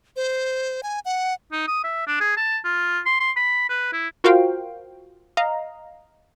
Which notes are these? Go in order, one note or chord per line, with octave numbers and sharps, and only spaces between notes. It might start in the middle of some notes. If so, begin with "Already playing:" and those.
C5
G#5
F#5
D#4
D#6
E5
D4
G#4
A5
F4
C6
C6
B5
B4
E4
F4 F#4 A#4 C5 F5 G5
D#5 F5 A#5